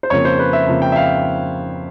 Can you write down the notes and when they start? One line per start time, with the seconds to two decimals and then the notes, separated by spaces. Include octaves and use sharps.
0.03 C5
0.10 F2 C#3 F3 A#3 C#5
0.25 C5
0.39 B4
0.53 E5
0.67 F2 C#3 F3 A#3
0.82 G5
0.92 E5
0.96 F5